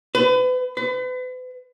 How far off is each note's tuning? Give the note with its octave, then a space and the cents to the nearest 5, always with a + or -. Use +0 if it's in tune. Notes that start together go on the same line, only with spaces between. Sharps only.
B4 +35
B4 +40